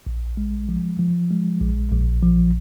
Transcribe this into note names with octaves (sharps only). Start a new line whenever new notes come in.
A#1
G#3
F3
F3
G#3
A#1
A#1
F3